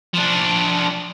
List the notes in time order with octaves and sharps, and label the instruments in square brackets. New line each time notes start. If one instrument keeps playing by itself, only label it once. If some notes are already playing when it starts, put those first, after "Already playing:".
[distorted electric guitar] F3 D4